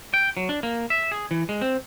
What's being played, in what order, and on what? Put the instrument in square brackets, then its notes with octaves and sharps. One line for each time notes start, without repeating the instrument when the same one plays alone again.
[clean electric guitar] G5
F#3
D4
A#3
E5
G#4
E3
G#3
C4